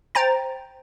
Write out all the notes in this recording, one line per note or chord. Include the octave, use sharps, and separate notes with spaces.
C5 G5 A#5 A6